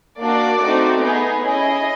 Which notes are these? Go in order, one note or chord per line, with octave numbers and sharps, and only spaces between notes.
A#3 D4 F#4 D5
A3 C4 D#4 F#4
B3 D#4 G#4
C#4 E4 G#4 D#5